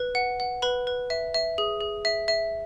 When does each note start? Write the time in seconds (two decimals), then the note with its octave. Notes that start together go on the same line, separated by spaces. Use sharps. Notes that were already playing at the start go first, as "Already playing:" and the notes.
Already playing: B4
0.15 F#5
0.40 F#5
0.62 B4 B5
0.87 B4
1.10 E5
1.34 E5
1.58 G#4
1.81 G#4
2.05 E5
2.28 E5